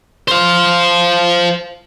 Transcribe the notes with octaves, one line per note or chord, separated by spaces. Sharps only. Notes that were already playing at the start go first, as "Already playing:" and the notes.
C5 F5